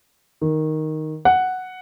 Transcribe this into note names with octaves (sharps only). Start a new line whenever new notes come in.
D#3
F#5